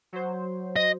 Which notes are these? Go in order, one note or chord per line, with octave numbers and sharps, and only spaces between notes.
F#3 C5
D#5